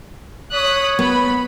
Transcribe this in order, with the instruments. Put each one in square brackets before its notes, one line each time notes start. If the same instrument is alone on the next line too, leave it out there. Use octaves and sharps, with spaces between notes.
[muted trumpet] C#5 [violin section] D#6 F#6 B6
[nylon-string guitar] B3 [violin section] B5